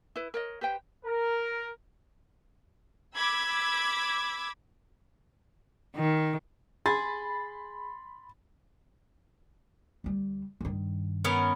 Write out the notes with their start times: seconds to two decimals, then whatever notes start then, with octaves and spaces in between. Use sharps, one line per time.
0.16 E4 B4
0.34 A#4 C#5 D#5
0.61 G4 B4 C5 G5
1.06 A#4
3.15 B5 D6 E6 G#6
5.96 D#3
6.86 G#4 B5 C6 A6
10.04 D2 G3
10.61 G2 D#3
11.24 B3 C#4 A#4